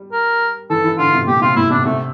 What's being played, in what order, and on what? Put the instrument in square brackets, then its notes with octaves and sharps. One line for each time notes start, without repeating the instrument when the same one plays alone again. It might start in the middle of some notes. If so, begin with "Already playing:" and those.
Already playing: [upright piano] G3
[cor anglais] A#4
[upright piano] E3 [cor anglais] A4
[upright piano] E3
[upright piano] D3 [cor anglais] F4
[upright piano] C3
[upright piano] A#2 [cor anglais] G4
[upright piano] C3 [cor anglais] F4
[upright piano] A#2 [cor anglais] E4
[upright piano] C3 [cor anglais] D4
[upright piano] C3 [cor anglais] A3